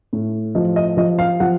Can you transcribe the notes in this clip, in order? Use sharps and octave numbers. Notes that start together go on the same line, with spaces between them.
A2
F3 D#5
D#5
F3 D#5
F5
F3 F#5